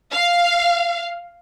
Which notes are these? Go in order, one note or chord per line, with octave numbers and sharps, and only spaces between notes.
F5